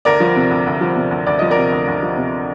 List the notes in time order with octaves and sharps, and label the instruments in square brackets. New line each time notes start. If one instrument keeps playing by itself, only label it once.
[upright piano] D2 A#4 D5
F3
C3
D2
D2
F3
C3
D2
D2 D5
F3 D#5
A#4 D5
C3
D2
D2
F3
C3